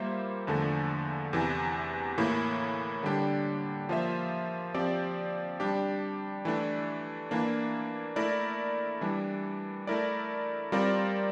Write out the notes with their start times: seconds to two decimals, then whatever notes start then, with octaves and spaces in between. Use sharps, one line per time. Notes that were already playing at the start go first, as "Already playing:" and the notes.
Already playing: G3 A#3 F4 C5 E5
0.47 E2 D3 F3 A3
1.33 E2 C3 E3
2.17 A2 E3 A#3 E4
3.03 D3 G3 D4 G4
3.89 F3 A#3 F4 C5 E5
4.74 F3 C4 G4 D5
5.60 G3 D4 G4
6.45 E3 A3 D4
7.31 E3 A#3 D4
8.16 A3 E4 A#4 D5
9.01 E3 G3 D4
9.87 A3 E4 A#4 D5
10.72 G3 C4 F4 A#4 D5